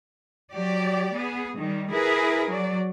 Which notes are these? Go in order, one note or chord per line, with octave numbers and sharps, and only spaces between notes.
F#3 G4 D5
B3 G#4
D#3 G3
E4 G#4 A#4 B4
F#3 D5